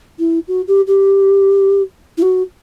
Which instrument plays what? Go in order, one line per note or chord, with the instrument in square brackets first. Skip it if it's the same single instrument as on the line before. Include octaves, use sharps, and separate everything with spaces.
[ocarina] E4
F#4
G4
G4
E4
F#4